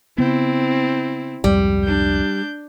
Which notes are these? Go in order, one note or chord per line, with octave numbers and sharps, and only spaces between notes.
C#3 B3 C4 E4
C2 F2 G#2 G3
D4 G6